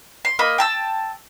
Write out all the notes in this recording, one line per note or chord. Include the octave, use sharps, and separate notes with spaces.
C6
A#3 D#5 B5
G5 A5 E6